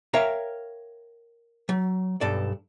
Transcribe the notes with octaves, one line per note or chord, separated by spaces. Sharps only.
A#4 C#5 E5 F5 G5 A#5
F#3
B1 G2 A4 D5